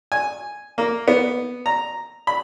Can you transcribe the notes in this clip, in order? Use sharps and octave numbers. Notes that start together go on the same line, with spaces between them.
G#5
A#3
B3
A#5
B5